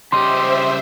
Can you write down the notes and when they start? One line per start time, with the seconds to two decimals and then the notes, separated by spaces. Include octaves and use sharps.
0.12 C#3 G3 G4 C5 D#5 E5 C6